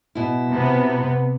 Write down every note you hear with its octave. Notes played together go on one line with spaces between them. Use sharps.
B2 E4
C3 B3